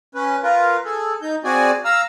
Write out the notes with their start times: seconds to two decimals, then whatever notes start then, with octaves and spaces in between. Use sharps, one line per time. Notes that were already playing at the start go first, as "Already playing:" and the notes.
0.15 C#4 B4
0.43 F4 A#4 B4
0.85 G#4 A4
1.22 D#4 G6
1.44 C4 F#4 G#4 D5 G#5
1.85 F5 A#5 E6 F6